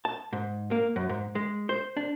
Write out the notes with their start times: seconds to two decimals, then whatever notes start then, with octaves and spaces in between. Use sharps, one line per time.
0.05 A5
0.33 G#2
0.71 A#3
0.96 F#2
1.09 G#2
1.35 G#3
1.69 C5
1.97 D4